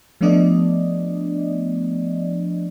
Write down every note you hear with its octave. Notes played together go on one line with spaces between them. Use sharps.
F3 A3 B3 D4 D5 D#5